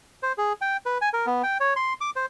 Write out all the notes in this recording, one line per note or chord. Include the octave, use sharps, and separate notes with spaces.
C5
G#4
G5
B4
G#5
A#4
B3
G5
C#5
C6
D6
C5